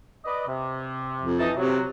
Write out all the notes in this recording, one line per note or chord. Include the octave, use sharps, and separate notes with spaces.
B4 D5 D#5
C3
F2
E3 D#4 A5
C3 F#3